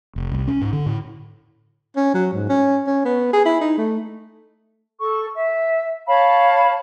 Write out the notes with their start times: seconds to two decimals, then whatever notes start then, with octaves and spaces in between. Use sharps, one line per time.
0.16 F1
0.32 C2
0.48 C#4
0.61 G#2
0.73 D3
0.86 A2
1.96 C#4
2.14 F#3
2.34 G#2
2.49 C#4
2.87 C#4
3.05 B3
3.33 G#4
3.45 E4
3.61 D#4
3.78 A3
5.00 A4 C#6
5.36 E5
6.07 C#5 F5 A5 B5